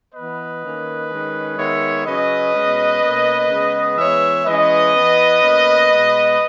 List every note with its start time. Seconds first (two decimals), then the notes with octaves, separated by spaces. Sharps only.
0.13 E3 B3 B4 D#5
0.62 D#3 A#3 C#4
1.09 D#3 G#3 C#4
1.57 D#3 G#3 B3 C#5 E5
2.05 C#3 F#3 C#4 B4 D#5
2.53 B2 G#3 C#4
3.01 B2 A#3 C#4
3.49 C#3 G#3 B3
3.97 E3 G#3 B3 C#5 E5
4.45 E3 G#3 C#4 B4 D#5
4.94 E3 B3
5.41 B2 A#3 C#4
5.88 B2 G#3 B3